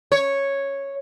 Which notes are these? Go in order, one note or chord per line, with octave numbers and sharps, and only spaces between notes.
C#5